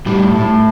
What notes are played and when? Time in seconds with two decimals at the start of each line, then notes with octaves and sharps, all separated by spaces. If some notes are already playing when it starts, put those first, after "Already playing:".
0.06 A2 G3
0.36 A2